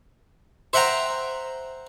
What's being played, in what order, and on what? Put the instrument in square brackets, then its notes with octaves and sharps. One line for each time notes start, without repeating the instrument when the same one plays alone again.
[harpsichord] C5 E5 F#5 G5 A#5